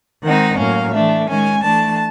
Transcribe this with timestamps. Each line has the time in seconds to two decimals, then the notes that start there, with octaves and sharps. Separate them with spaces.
0.23 D#3 G#3 C4 D#4 F#5
0.58 A2 F#3 A#3 C#4 F5
0.92 E3 A3 D4 E5
1.28 D#3 G#3 C#4 G#5
1.62 E3 A3 D4 A5